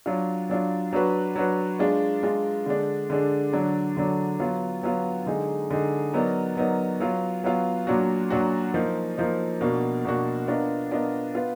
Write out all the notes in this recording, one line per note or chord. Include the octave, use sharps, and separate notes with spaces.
F#3 D4 F4
F#3 D4 F4
F#3 D4 F#4 B4
F#3 D4 F#4 B4
G#3 D4 F4
G#3 D4 F4
D3 G#3 D4
D3 G#3 D4
D3 F#3 D4
D3 F#3 D4
F#3 B3 F4
F#3 B3 F4
D3 G#3 D#4 G#4
D3 G#3 D#4 G#4
F#3 B3 D#4 A#4 D5
F#3 B3 D#4 A#4 D5
F#3 B3 F4
F#3 B3 F4
A#2 F#3 D4 F#4
A#2 F#3 D4 F#4
F3 A#3 D#4
F3 A#3 D#4
B2 A#3 D4 F#4
B2 A#3 D4 F#4
B3 D4 F4 A#4 D#5
B3 D4 F4 A#4 D#5
B3 F4 B4